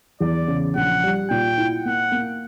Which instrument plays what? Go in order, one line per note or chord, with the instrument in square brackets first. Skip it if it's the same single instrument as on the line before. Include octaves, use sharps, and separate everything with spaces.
[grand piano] E2 [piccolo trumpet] D5
[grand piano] C#3
[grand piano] A#1 [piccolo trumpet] F#5
[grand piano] G3
[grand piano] A#2 [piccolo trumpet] G5
[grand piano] E4
[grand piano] A#3 [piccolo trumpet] F#5
[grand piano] A#3